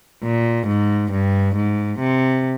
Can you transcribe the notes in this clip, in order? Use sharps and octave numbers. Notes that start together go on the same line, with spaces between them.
A#2
G#2
G2
G#2
C3